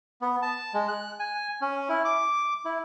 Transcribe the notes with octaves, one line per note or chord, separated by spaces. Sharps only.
B3
A5
G#3
F#6
G#5
C#4
E4
D6
E4